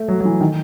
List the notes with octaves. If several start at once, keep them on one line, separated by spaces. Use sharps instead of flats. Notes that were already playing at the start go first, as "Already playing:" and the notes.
Already playing: A3
F#3
F#3
E3
D#3